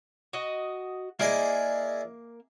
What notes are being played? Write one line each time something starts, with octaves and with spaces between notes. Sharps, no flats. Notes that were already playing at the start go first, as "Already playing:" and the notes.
F#4 D#5
A#3 E4 G#4 D5 D#5